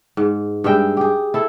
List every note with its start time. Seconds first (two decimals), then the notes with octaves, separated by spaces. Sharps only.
0.17 G#2
0.64 G2 G#3 E5 G5
0.97 G4 G#4
1.34 E4 A4